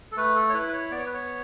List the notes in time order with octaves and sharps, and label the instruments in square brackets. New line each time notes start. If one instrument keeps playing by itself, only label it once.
[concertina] A4
A3 B4
A4
C#5
E4 B4
B4
C#5
B3 D5
C#5
B4
C#5